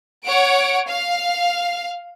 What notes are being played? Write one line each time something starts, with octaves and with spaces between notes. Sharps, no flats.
C#5 F#5 D7
F5